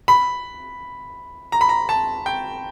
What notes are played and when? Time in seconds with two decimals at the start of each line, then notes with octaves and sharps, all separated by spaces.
0.08 B5
1.52 A#5
1.61 B5
1.69 A#5
1.89 A5
2.26 G5